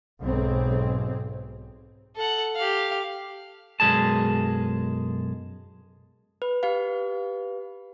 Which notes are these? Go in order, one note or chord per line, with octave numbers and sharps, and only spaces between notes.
B1 G#2 C4
A4 F#5
G4 F5
B1 F#2 B2 G#3 G#4 A5
B4
G4 B4 F5